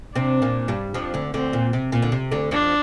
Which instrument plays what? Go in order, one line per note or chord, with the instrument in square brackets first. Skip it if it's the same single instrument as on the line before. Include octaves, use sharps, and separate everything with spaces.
[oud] C3 C4 [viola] D4
[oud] A#2 A#3
G2 G3
[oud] F2 F3 [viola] D4
[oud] D2 D3
[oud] D2 D3 [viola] C4
[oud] A#2
C3
A#2
D3
C3
D2 D3
[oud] F2 F3 [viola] D4